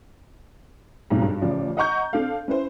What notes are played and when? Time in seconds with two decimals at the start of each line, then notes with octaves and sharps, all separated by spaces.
1.10 B1 F2 G#2
1.22 G2
1.42 A1 C#3 F3 D5
1.77 D#5 F#5 A#5 C#6 G6
2.13 C4 D4 A4 F5
2.48 C#4 E4 B4 C5